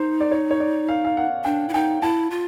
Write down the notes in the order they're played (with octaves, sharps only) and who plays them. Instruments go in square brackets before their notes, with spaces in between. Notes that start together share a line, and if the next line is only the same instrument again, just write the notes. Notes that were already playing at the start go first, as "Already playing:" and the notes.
Already playing: [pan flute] D#4 [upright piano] C5
[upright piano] D5
C#5
C#5
D5
F5
F5
F#5
[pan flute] D4 [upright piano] G5
[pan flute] E4
[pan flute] D#4 [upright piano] G5
[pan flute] E4 [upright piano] A5
[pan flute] F4